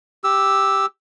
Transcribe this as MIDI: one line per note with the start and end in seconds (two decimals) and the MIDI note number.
0.24 0.86 67
0.24 0.86 88